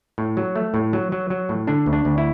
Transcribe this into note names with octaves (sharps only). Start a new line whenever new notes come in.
A2
F#3
A3
A2
F#3
F#3
F#3
A2
D3 D4
D2
D4
D2
E4